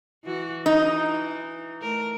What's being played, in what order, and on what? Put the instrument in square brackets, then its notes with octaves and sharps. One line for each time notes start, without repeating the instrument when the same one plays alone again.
[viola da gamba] E3 F#4
[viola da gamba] E3 [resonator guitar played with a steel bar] D#4
[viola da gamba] A3 A#4